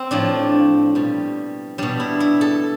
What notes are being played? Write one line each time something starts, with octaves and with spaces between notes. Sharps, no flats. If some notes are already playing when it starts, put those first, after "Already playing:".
Already playing: C4
A2 F3 D4
B2 G3
B2 G3 D4
E4
E4
A4